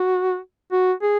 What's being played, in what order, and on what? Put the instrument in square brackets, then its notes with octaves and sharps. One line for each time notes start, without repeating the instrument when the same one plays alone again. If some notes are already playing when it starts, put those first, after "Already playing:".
Already playing: [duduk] F#4
F#4
G#4